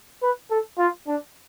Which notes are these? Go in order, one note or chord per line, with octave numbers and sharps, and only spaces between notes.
B4
A4
F4
D4